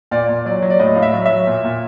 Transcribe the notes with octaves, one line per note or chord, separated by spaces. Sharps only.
A#2 D5
A#2
F#3 D5
F#3
D5
A2 D#5
A2 F5
E5
F#3
F#3 E5
A#2
A#2